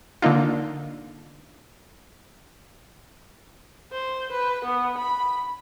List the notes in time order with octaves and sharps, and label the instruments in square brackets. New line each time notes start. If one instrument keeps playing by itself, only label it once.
[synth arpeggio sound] D3 A#3 D#4 F4
[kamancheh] C5
B4
B3
B5